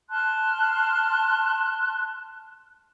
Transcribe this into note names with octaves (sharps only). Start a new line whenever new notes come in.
A5 C6 F6 F#6